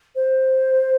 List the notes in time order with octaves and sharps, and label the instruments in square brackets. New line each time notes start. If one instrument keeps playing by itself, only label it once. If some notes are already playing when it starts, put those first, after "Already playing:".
[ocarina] C5